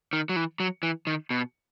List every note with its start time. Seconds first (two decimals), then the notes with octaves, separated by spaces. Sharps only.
0.13 D#3
0.29 F#3
0.36 E3
0.60 F#3
0.83 E3
1.07 D#3
1.30 B2